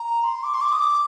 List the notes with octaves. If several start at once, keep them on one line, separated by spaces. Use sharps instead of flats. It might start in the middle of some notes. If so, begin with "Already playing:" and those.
Already playing: A#5
C6
D6
C6
D6
D#6
D6